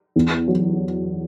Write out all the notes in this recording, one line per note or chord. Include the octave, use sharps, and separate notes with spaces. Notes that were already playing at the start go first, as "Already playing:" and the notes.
E2
F#3